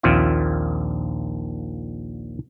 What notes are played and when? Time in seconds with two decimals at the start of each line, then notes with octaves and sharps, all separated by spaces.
0.03 A#1 D#2 A#2 C4 F4 E5